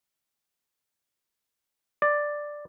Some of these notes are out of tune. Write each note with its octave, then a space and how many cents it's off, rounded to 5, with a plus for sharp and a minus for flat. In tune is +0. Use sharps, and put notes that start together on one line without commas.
D5 +5